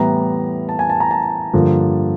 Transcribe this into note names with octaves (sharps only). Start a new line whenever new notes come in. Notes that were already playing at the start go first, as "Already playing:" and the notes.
Already playing: A2 E3 G3 B3 A#5
A5
G#5
A5
A#5
A5
G2 D3 F3 A#3